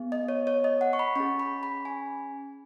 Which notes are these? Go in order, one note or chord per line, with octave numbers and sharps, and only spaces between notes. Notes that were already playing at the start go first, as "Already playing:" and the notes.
Already playing: B3 G#4
D#5
C#5
C#5
D#5
F#5
C#6
B5
C#4 G#4 C#6
B5
B5
G#5